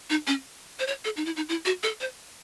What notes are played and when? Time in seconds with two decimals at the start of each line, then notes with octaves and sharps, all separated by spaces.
0.10 D#4
0.27 C#4
0.79 C5
0.87 C#5
1.05 A4
1.17 D#4
1.26 E4
1.36 D#4
1.49 E4
1.65 F#4
1.83 A4
2.01 C5